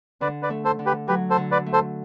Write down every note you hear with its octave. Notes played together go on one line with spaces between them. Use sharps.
D3 B4 D5
B4 D5
A3
A4 C5
D3
G4 B4
F#3 G4 B4
A4 C5
D3
B4 D5
A3
A4 C5